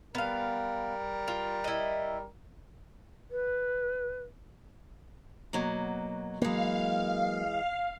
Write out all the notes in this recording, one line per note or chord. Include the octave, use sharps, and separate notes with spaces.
G3 B3 A#4 F5
F4
E4 D#5
B4
B2 F#3 A#3
E3 F#3 G#3 A#3 F5